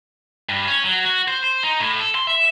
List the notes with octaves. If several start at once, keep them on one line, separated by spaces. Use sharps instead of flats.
G2
C#4
F#3
F#4
C5
C5
D#4
A2
A4
C6
E5